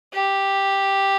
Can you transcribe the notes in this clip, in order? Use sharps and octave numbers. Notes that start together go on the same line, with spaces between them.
G4